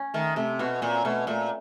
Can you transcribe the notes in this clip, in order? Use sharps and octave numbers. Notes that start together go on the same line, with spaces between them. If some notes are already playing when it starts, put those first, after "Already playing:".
Already playing: C#4
D#3 A3
C3 A3
B2 F#4
A#2 C#4
B2 A3
A#2 A3